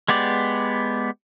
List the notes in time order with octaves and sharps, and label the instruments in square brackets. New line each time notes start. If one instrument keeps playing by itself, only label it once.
[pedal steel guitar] G#3 B3 G4 D5